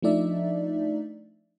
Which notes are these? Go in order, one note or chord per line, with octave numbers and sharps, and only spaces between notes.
F3 A3 D4 D#4 D5 E5